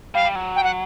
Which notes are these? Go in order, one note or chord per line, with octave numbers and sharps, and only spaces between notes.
G3 F5
G3
F#3
G5
F#5